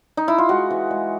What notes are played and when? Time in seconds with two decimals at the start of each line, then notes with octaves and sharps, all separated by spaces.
0.17 D#4
0.28 E4
0.38 F4
0.49 G#3 F#4
0.71 E3
0.91 G#3